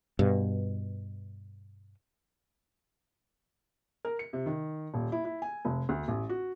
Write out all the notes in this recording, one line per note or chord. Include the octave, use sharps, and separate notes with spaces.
G2 B2
A#4
C#7
C3
D#3
D#1
E4
E4
G#5
F1
D2
A1
F#4